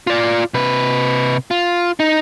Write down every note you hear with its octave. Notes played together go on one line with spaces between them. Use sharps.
F4 D5
C3 B4
F4
D#4